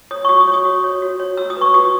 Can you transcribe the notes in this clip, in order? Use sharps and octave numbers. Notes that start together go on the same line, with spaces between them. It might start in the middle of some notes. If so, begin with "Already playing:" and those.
C#5 D#6
C#6
F#4 D#6
D#6
C#5
D#6
F#4
C#5
F#4
C#5
F#4 E6
D#6
B4 C#6
F#4 D#6